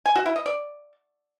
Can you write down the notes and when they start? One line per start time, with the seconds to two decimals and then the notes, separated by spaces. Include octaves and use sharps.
0.06 G#5
0.16 F#4
0.26 E4
0.36 D#5
0.46 D5